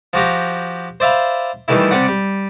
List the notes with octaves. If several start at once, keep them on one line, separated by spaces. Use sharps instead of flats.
F3 F#4 G4 A#5
C5 D5 E5 F5 B5
D#3 E3 G3 A3 E4
C3 G3 D5 F#5
G3